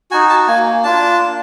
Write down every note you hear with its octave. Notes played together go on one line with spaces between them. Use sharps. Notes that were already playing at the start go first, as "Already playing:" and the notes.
D#4 F#4 G#5
A5
A#3 G#5
D4 F4 A5
A#3